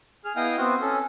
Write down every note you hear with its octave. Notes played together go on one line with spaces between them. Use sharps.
G#4 F6
B3 E4 D#5 F5 G5 D#6
B3 C4 F#4
C#4 A4